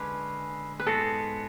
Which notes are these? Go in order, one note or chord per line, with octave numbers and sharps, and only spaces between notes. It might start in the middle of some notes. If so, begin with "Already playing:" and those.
Already playing: D3 G#3 C#4 B4
B4
G#2 G#3 B3 F#4 A4